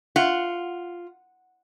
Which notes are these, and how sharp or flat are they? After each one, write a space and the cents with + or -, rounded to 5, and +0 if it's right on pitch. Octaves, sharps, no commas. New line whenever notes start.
F4 +0 F#5 -5